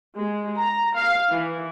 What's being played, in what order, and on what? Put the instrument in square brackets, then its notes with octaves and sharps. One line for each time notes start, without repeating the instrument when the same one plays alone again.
[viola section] G#3
A#5
F5
E3